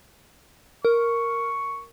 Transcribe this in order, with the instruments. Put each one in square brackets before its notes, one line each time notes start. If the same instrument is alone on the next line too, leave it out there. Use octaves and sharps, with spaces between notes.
[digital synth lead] A#4 [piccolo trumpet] C#6